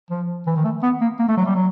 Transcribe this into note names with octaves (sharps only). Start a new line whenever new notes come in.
F3
E3
D#3
A3
B3
A#3
A#3
A3
F#3
G3
F#3